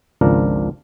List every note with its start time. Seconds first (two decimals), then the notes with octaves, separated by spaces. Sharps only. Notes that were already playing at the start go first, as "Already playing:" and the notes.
0.21 G#1 C#2 F3 D4 A#4